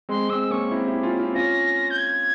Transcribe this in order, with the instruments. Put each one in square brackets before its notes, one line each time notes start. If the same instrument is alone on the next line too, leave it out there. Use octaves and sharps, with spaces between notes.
[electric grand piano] G#3 C4 [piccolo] C6
[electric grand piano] G#3 C4 [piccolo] E6
[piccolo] E6
[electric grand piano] A#3 C#4 [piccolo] C#6
[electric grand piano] C4 E4
E4 G4
C#4 F4
C4 E4
[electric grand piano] C#4 F4 [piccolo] A#6
[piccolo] G6
G#6